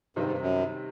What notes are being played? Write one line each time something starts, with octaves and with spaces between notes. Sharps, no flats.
G2 C3 D#3 G3 C4 D#4
G#2
G2
F#2